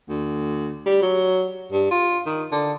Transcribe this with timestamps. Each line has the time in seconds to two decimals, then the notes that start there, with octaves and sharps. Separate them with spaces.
0.09 D2
0.86 G3
1.02 F#3
1.72 G2
1.91 F4
2.26 D#3
2.52 D3